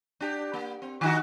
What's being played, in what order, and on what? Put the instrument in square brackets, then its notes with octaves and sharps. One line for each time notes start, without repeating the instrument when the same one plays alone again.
[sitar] D4 G4
A#3
C4
D#3 D#4 F#4